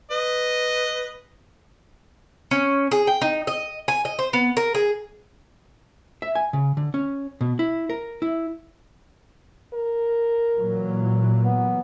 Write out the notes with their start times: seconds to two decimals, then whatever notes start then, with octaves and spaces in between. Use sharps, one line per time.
0.11 B4 D#5
2.51 C#4
2.91 G#4
3.07 G5
3.22 D#4
3.47 D#5
3.88 G#5
4.05 D#5
4.19 C5
4.33 B3
4.57 A#4
4.75 G#4
6.22 E5
6.35 G#5
6.53 C#3
6.77 D3
6.94 C#4
7.41 B2
7.59 E4
7.90 A#4
8.22 E4
9.74 A#4
10.57 A#2 E3 F#3
11.45 B3